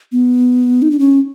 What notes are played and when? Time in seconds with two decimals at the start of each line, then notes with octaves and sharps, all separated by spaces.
0.12 B3
0.82 D#4
0.91 D4
0.99 C#4